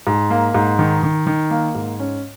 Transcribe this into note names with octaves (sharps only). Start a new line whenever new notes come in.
G#2
A#3
G#2
D#3
D#3
D#3
A#3
G#2
C#4